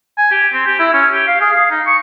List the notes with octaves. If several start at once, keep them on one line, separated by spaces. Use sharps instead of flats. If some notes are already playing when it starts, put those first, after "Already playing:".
G#5
G4
C4
G4
E4
C#4
G4
F5
G#4
F5
D#4
C#6